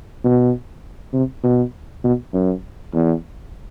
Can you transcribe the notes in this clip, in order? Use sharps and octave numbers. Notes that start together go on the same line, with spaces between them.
B2
C3
B2
B2
F#2
E2